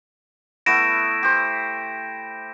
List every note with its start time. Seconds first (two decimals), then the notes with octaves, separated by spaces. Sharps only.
0.66 A3 B3 E4 A#6 D7 E7
1.23 G4 C5